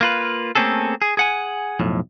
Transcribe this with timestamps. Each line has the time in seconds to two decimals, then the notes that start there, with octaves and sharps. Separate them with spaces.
0.01 A#3 F4 B4
0.55 A3 A#3 C4 C#4 G#4 A4
1.02 G#4
1.17 G#4 F#5 G#5
1.80 B1 F2 A2